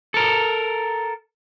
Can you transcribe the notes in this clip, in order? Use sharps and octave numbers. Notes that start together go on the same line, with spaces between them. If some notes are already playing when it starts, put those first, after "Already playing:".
A4 A#4